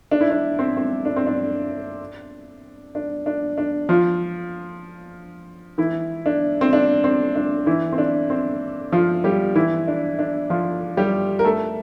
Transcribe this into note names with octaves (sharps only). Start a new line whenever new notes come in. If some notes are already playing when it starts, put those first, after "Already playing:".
D4
E4
D4
C4
C4
D4
C4
D4
D4
D4
D4
F3 F4
E3 E4
D4
C4
D4
C4
D4
E3 E4
C4
D4
C4
F3 F4
G3 G4
E3 E4
D4
D4
F3 F4
G3 G4
A#4
A3 A4